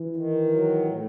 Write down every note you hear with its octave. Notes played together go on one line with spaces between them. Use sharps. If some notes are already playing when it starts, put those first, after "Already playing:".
Already playing: E3
D#3
F#3
A2